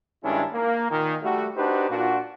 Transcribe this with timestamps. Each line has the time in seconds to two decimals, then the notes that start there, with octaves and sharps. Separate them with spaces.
0.24 G2 D#3 G#3 C#4 D4 E4
0.53 A#3
0.90 A#2 D#3
1.23 G3 A3 F#4
1.57 D4 D#4 F#4 G4 B4 C5
1.90 A#2 D4 F4 F#4